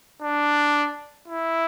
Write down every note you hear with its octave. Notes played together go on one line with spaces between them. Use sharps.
D4
E4